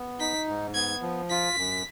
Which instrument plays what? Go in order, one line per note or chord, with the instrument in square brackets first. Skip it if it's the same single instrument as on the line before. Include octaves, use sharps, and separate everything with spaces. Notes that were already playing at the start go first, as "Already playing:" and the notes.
Already playing: [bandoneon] B3
[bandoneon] D#4 [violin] B6
[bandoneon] G#2
[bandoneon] B3 [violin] G#6
[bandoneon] F3
[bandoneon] F4 [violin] B6
[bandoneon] F#2